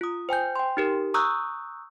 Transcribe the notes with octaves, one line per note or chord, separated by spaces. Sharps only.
F4 D#6
C5 G5 G#5 G6
G5 C6
D#4 G4 A#4
A#5 C#6 D#6 E6 F#6 G6